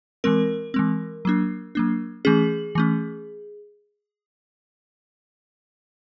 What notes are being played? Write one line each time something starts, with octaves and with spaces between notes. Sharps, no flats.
E3 G#3 C4 A#4
E3 G#3 C4
F#3 A#3 D4
F#3 A#3 D4
E3 A3 C#4 G#4
E3 A3 C#4